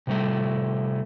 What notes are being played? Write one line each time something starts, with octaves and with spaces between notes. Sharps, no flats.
C3 G3 A3